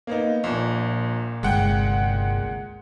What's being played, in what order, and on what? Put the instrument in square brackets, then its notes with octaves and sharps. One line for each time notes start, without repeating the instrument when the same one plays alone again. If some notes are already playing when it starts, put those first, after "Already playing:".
[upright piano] A#3 B3 D#4
[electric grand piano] A#1 [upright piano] A#2
[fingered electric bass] G1 C2 [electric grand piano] G#3 F#5 G5